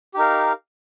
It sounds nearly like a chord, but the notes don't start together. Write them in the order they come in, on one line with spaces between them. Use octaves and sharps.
G4 D#4 A#4 F5